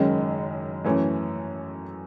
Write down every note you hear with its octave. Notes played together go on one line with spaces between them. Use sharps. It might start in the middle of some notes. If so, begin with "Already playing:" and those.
Already playing: F#1 F#2 D#3 G#3 C#4
F#2 E3 A3 C#4